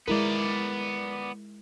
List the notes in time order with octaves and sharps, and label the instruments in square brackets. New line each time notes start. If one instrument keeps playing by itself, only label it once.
[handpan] G#3 E4 A#4 [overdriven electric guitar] B3 D5